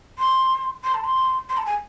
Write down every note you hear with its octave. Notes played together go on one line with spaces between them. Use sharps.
C6
C6
A5
C6
C6
A5
G#5